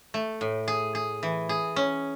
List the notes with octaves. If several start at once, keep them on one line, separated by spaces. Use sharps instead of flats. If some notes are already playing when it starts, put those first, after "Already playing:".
A3
A2
G#4
G#4
E3
G#4
C#4